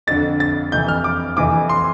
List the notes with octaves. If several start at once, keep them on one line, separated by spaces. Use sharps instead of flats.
F2 D3 A6
A6
F2 C3 E3 G6
F6
D6
F2 C3 E3 D6
C6